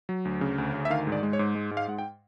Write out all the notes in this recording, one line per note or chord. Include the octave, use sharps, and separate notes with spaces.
F#3
D2
C#3
D2
D2
E5
D#3 F5
G#2
D5
G#3
C#5
G#2
G#3
G#2
F5
G#2 F#5
G5